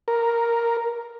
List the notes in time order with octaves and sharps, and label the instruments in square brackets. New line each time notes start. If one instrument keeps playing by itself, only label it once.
[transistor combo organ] A#4